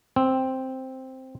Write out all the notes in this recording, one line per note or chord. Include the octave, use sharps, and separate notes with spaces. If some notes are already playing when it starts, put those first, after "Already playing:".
C4